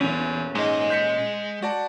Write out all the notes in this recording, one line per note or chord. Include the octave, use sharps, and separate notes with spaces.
E2 A#2 C#4
G#2 G#3 D#5
G6 B6 C#7
F#4 D5 A5